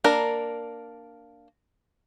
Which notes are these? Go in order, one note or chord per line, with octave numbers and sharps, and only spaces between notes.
A#3 D4 A#4